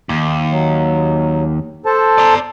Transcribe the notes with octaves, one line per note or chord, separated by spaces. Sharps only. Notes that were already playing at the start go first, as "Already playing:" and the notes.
D#2
F#3
A4 C5 A5
D5 A#5